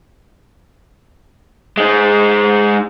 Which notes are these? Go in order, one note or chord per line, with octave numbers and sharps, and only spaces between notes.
G#3 D#4